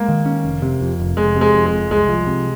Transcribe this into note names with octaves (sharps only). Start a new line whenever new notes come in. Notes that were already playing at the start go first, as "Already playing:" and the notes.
Already playing: G#3 A#3
D#3
C#4
F1
C3
F2
F1
F1 G#3
C3
G#3
F2
G#3
F1
C2 G#3
F3
C3